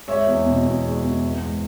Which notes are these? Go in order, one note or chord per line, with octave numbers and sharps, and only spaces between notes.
G#3 C#5 E5
E2
B2
E2
G#3
E2
B3
G#2